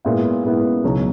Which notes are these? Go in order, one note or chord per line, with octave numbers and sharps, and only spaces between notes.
A#2 G#3 B3 E4
A#2 G#3 B3 E4
C#2 B2 F#3 B3 D#4